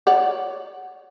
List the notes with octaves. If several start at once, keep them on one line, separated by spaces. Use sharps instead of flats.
C#5 D5 F#5